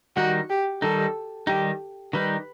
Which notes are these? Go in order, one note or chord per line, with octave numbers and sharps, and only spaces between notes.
D#3 G3 D#4 F#4
G4
D#3 G3 D#4 A4
D#3 G3 D#4 G4
D#3 G3 D#4 B4